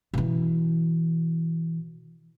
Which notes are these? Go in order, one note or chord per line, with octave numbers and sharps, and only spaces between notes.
B2 E3